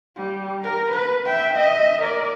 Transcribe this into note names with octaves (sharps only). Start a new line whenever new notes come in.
G3
A#4 A#5
B4
E5 G5
D#5 E5
A#4 D5